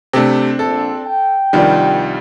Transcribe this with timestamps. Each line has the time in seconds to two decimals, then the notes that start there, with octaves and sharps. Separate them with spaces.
0.13 C3 A3 C4 D4
0.59 A#1 A4
1.07 G5
1.53 C2 D#3 F3 G3 D4